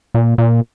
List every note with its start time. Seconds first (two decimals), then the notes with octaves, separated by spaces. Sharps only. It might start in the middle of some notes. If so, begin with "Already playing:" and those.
0.14 A#2
0.38 A#2